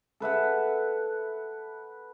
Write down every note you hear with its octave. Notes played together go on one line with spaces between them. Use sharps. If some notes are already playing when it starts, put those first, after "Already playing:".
A4 B4 E5 F#5